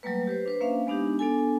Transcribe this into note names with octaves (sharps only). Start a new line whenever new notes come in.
F#3 G3 A3 A#3 B4
G4 B4 C5
D4 B4 C5
A#3 C#4 D4 E5 F5
G#3 B3 D4 D#4 G4
B3 D4 A4 G#5